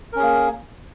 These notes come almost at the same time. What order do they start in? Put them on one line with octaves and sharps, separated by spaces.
A#4 C#4 G#4 A#3